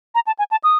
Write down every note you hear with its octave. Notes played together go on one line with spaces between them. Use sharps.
A#5
A5
G#5
A5
D#6